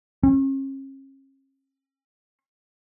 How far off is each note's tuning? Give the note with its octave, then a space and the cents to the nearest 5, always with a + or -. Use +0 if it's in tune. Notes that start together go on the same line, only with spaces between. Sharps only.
C#4 -40